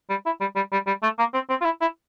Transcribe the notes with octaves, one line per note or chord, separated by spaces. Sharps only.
G3
E4
G3
G3
G3
G3
A3
A#3
C4
C4
F4
E4
E4